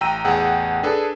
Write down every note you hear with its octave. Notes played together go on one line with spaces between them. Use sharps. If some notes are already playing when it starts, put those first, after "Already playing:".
A1 G5 A#5 E6 D#7
A1 E2 G#4 F#5 G5 E6
D4 G#4 A4 B4